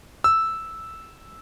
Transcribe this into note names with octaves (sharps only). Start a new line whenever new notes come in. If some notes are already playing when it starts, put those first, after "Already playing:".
E6